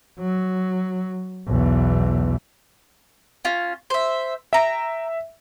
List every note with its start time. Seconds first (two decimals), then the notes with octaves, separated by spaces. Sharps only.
0.19 F#3
1.47 B1 E2
3.45 C#4 F4
3.90 C5 E5
4.53 E5 G5 A#5